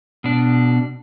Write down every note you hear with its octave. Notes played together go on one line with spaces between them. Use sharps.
B2 D4